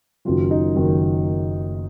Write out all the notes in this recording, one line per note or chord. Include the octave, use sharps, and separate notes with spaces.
F#1 F#2 D#3 F#3 F4
D#4
F#1 F#2 D#3 F#3